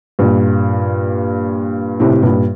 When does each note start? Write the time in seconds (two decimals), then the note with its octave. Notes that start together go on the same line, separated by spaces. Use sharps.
0.19 G2 A#2
2.00 A2 C3
2.23 G2 A#2